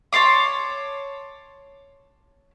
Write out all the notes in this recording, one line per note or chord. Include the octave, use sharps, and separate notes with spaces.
C#5 A5 C6 D6